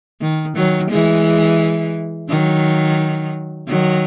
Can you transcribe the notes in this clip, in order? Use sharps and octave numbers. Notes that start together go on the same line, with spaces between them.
D#3
D#3 F#3
E3 G#3
D#3 F#3
D#3 F#3